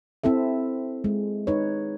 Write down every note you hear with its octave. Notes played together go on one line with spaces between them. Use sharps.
C4 E4 A4 E5
G#3
D#4 B4 C#5